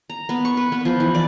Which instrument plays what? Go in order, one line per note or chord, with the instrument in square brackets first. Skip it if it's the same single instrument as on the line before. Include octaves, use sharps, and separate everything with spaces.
[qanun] A#5
B3
C#6
B4
B3
F3
E3
D5